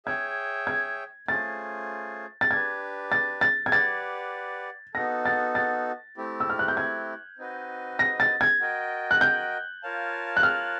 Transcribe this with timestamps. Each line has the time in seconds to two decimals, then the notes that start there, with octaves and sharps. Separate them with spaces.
0.06 G#4 C#5 E5 G5 G#6
0.67 G#6
1.28 A3 C#4 F4 G#4 C5 A6
2.41 A6
2.50 D4 G4 B4 G#6
3.12 A6
3.41 A6
3.66 G#6
3.72 G4 B4 D5 F#5 A6
4.94 B3 D#4 F#4 A4 A#6
5.25 A6
5.55 A6
6.17 A3 C4 E4 G4
6.40 E6
6.50 F6
6.59 F#6
6.68 G6
6.77 G#6
7.38 C4 D#4 F#4 B4 D#5
7.99 A#6
8.20 A6
8.41 G#6
8.60 F#4 A#4 D#5 G5
9.11 F#6
9.21 G6
9.83 F4 A#4 C#5 F5 A5
10.37 F#6
10.43 F6